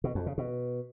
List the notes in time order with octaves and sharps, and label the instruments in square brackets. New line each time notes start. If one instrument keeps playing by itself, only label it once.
[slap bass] B2
F2
C#3
B2